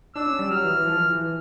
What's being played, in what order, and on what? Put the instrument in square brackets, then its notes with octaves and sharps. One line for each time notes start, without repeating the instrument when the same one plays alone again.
[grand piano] D4 [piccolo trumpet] E6
[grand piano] C#4
G3
[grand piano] F#3 [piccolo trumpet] F6
[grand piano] E3
E3
F3
E3
E3
E3